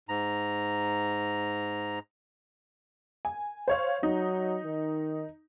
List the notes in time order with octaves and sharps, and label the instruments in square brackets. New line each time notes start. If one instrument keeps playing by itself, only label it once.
[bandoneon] G#2 A#5
[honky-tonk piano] G#5
C5 C#5 F5
[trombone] F#3 [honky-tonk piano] D#4
[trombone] D#3